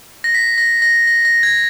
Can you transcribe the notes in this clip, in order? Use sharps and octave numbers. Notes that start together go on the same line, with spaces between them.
A#6
B6
A#6
A#6
A#6
A#6
G#6